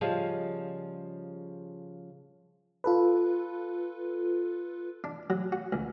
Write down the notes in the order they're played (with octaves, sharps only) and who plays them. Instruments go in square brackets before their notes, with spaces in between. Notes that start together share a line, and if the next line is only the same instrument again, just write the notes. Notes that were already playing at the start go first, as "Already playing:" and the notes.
[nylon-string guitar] C#3 F3 G3 G#4 D#5 F5
[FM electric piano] F4 A4 B4
[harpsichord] D4
F#3
F#4
C#2